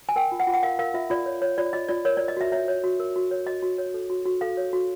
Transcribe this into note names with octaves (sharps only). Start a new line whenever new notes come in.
G#5
A#4 G5
F4
F#5
F4
F#5
A#4 F5
A#4 F5
F4 E5
F4 D5
C#5
C#5
F4 D5
F4 D#5
F4 D5
A#4 C#5
C#5 D5
D#5
F#4 E5
C#5 E5
C#5
F#4
A#4
F#4
C#5
F#4 D#5
F#4
C#5
A4
F#4
F#4
A4 F5
C#5
F#4